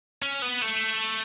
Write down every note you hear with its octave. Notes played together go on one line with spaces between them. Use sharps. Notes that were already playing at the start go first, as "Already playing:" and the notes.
C#4
B3
A3